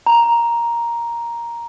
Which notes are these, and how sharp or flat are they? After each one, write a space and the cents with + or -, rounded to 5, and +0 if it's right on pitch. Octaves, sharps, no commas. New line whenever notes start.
A#5 +5